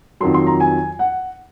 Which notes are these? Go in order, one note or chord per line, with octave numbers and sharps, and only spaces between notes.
F2 D#3 F#3 C6
C6
A#5
G#5
F#5